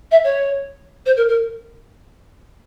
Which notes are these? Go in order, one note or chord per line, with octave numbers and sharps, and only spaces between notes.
E5
C#5
C5
A#4
A#4